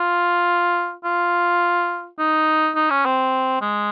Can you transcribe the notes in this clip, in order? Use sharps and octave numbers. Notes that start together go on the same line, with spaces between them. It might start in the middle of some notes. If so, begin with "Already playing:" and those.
Already playing: F4
F4
D#4
D#4
C#4
C4
G#3